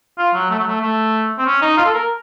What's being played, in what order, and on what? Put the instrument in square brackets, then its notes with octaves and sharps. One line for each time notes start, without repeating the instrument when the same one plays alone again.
[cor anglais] F4
F#3
A3
F#3
A3
A3
C4
C#4
D#4
F4
A4
A#4